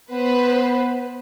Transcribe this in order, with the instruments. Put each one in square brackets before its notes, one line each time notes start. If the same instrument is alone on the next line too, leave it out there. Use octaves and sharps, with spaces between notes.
[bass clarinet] B3 [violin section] B4 C5